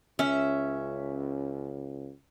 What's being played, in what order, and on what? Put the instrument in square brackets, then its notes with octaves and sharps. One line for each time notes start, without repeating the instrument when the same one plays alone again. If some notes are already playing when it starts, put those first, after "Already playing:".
[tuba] C#2 [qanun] C#4 [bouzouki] E5